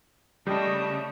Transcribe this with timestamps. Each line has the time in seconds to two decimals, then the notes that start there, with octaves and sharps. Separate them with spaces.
0.47 C#3 G3 A3 D4 D#5